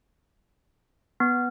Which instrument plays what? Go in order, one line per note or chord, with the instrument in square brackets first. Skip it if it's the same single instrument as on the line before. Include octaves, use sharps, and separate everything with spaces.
[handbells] B3